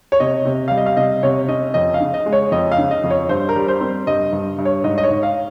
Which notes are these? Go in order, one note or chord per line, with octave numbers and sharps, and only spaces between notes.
C#5
C3 D#5
C3
G3 F5
D#5
F5
C3 D#5
C3 C#5
C#4 D#5
F2 D#5
F5
C#3
D#5
G#3
C#5
F2 D#5
F5
C#3
D#5
F2
C#5
G2 C5
A#4
G3
C5
C4
G2 D#5
G2
G2
C#5
G#2 D#5
D#5
C#5
G#2
F5